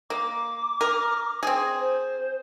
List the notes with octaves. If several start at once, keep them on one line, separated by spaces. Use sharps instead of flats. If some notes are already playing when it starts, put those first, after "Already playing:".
A#3 D6
A#4
C4 G#4
C5